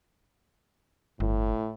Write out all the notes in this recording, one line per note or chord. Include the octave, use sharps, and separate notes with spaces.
G1 A2